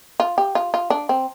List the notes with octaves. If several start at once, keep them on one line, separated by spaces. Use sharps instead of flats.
F4
G4
F4
F4
D4
C4